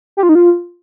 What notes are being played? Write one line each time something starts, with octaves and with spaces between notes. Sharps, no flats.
G4
F4
D#4
F4